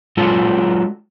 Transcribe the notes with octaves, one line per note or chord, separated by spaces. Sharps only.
F#3 G#3 D4 F4 A4